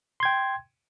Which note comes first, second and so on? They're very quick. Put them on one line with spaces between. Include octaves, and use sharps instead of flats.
C6 G#6 G5